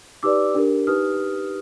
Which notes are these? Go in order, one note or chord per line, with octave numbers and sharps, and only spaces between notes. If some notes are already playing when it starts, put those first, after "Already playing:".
D#4 G4 B4 D5 D6 E6
D4 G4 A#4
D#4 G4 B4 D#6 F6